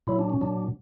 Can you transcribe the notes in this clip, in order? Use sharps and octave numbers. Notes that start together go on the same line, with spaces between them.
A#2 F#3 E4
D4
C#4
A#2 F#3 D4